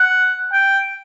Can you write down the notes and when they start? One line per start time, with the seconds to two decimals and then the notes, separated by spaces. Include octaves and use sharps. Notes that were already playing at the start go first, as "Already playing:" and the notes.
Already playing: F#5
0.53 G5